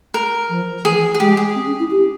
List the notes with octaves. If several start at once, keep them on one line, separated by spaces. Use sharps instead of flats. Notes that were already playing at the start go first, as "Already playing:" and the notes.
A#4
F3
E3 G#4
G#4
G#3 G4
G#4
C4
C#4
E4
G4